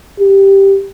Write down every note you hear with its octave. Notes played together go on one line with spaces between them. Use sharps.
G4